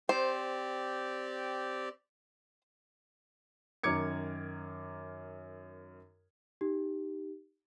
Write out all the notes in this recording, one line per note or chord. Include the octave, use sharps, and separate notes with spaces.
C4 G4 C5 D5
F#2 D#3 A#4 D6 G#6 C#7
D#4 G4